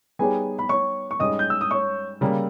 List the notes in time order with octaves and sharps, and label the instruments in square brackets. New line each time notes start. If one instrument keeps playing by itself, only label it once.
[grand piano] G3 B3 D#4 G4 C#5 [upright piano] G#4 G#5
[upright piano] B5
C#5 C#6
C#6
[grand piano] G#2 G3 C#4 G#4 [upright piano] D#5 D#6
[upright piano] G6
E6
D#6
C#5 C#6
[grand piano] C#3 G3 A#3